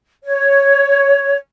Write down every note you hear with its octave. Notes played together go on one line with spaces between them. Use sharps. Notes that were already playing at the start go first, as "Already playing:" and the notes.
C#5